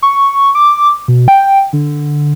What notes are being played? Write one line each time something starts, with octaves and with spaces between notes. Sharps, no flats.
C#6
D6
B2
G5
D3